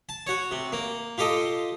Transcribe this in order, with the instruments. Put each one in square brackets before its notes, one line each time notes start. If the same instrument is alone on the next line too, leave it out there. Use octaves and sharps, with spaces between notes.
[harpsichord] A5
F#4 C#5
C3
A#3
F4 G4 A4 D#5